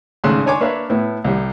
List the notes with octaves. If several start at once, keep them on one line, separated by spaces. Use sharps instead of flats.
G#1 G#2 C#3 A3 C6 F#6
D4 C#5 G#5 C6 D6
A#3 D4 B4 C#5 E5 F5
A2 B3 E4
C2 G3